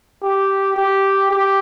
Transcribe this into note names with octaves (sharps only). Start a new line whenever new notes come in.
G4
G4
G4